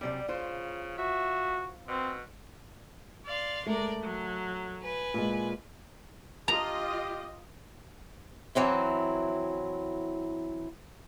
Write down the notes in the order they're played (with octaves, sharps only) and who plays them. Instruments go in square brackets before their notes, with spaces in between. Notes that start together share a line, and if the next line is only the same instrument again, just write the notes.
[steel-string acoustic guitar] F#2 C3 D5 [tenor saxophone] G3
[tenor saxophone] C#3 [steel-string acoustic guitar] F4 C5
[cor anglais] F#4 [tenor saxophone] E5
[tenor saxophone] B2 [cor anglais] C4
[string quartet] D5 F5 C6
[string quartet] G#3 A#4 D5 [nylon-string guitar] A3
[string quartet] F#3
B4 G#5
[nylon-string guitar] A#2 G#3
[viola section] F4 D#5 [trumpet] G4 [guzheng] A#5
[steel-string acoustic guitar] E3 F#3 C4 E4